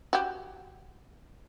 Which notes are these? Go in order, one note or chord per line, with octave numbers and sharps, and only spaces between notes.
F#4 G4